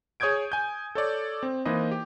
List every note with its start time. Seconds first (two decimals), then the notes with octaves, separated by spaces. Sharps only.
0.20 G#4 C#5 D#6 G6 G#6 D7
0.52 G#5 G6
0.95 A4 C#5 D5
1.43 C4
1.65 E3 A#3 D#4 B4 C5 D#5
1.92 G4